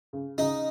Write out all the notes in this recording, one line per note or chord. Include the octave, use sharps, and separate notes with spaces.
C#3
C#3 D#4